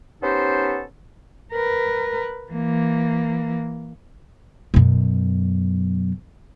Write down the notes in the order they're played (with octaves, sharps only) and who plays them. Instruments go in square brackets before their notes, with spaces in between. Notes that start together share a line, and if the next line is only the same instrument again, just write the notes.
[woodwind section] B3 C#4 D#4 G4 A4 C5
[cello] A#4 B4
E3 A#3
[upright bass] F#2 B2